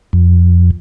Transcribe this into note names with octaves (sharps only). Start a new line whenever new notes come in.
F2